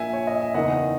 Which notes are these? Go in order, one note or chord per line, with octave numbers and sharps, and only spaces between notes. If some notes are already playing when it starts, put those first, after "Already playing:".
Already playing: A#1 A#2 E5 G#5
C#5
D#5
E5
F#1 E2 D#3 D#5 F#5